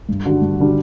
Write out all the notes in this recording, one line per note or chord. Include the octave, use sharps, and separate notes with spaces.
G2
D3 G3 D4 F#4
G2
D3 G3 D4 F#4